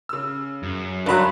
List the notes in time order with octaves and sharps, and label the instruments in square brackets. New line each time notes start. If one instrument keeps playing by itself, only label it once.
[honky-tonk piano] C#3 E6
[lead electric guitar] F#2
[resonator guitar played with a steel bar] G2 F#3 [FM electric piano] A#4 B5 [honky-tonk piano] A5 C6